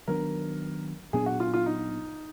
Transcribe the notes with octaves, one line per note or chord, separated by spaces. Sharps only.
D#3 F#3 B3 D4 A#4
A#2 F#3 B3 D4 G#4
F#4
F4
F4
D#4